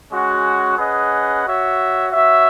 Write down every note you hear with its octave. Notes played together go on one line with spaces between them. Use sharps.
G#3 C#4 F#4
C#4 G#4 B4 D#5 F#5
F#4 C#5 E5
F#4 C#5 E5